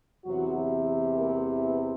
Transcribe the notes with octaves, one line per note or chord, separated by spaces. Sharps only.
E2 C3 E3 F#3 F#4
A#3 A#4
B3 B4